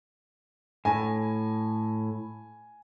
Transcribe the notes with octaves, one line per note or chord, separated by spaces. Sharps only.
A2 G#5